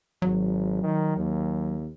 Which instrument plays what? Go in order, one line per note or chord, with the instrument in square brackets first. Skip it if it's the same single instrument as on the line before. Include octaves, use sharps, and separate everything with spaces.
[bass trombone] G#1 [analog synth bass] F#3
[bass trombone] D#3
D#2